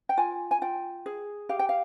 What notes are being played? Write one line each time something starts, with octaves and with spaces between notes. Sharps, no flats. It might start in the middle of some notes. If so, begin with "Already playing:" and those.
G5
F4 G#5
G#5
F4 G5
G#4
G4 F5
G5
F5